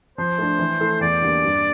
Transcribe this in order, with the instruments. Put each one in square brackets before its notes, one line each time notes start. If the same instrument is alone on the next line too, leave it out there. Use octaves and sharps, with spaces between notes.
[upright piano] F3 [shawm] C5
[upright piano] A3 D4
E3
A3 E4 A4
[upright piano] E2 [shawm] D5
[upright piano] D3 G3 A#3
G2